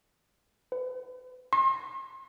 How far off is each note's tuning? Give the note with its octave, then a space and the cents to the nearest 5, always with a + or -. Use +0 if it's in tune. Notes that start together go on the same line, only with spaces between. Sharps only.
B4 +40
C6 +40